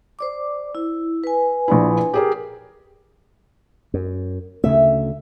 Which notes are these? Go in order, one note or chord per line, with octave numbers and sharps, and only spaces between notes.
C5 D5 D6
E4
B4 G#5
A#1 D4 E4
G4 G#4 A#4
F#2
D2 C#3 A3 E5